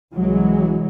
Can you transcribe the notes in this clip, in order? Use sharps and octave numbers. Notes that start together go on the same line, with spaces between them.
C2 E3 F#3 G#3